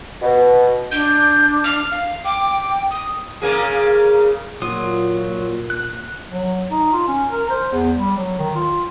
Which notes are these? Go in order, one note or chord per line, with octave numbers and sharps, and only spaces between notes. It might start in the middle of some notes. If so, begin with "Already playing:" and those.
B2
D4 G6
F6
F5
G5 D6
D#6
C#3 A#3 G#4
A#2 F#3 F4 D#6
F#6
F#3
D#4
F4
C#4
A#4
C5
E2
G3
F#3
D#3
F4